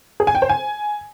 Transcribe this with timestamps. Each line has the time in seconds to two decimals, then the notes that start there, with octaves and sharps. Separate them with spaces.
0.20 G#4
0.27 G#5
0.35 G5
0.42 C5
0.49 G#5